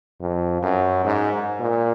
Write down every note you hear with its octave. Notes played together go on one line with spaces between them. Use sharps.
F2
F#2
G#2
A#2